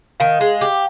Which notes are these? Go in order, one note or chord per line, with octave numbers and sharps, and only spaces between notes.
D#3 F5
G#3
G4